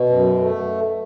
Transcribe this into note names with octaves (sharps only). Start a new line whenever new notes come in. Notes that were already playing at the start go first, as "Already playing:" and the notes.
Already playing: B2
F#2
A3